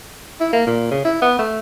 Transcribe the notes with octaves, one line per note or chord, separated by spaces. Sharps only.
E4
A#3
A#2
C#3
E4
B3
A3